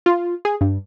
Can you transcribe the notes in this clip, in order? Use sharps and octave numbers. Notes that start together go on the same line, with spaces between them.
F4
G#4
G2